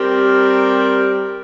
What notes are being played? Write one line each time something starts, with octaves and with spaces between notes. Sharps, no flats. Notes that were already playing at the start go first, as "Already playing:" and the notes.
Already playing: G3 C4 G4 A#4